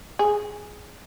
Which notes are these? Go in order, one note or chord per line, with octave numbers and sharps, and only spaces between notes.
G#4